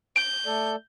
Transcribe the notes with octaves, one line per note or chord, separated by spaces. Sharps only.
G6 D7
A3 A4 D5